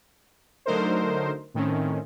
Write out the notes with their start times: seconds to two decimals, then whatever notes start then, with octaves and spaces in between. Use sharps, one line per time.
0.66 D3 F#3 A3 D#4 A#4 C5
1.54 A2 D#3 C4 C#4